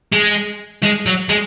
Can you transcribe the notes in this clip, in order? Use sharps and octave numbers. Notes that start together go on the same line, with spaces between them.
G#3
G#3
F#3
G#3